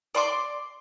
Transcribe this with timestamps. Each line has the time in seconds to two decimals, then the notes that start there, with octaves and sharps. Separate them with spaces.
0.15 D5 C6 D6